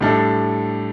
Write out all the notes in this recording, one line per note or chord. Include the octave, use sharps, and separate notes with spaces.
A2 G3 D4 A4